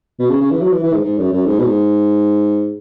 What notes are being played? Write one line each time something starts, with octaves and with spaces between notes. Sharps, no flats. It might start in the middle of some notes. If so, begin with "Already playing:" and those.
B2
C#3
C#3
E3
F#3
E3
E3
G#2
G#2
F#2
F#2
G#2
B2
G#2